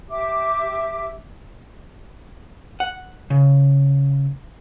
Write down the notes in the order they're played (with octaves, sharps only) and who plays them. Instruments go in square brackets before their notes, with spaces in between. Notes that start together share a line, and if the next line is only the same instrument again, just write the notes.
[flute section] G4 E5 D6
[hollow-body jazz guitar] F#5
C#3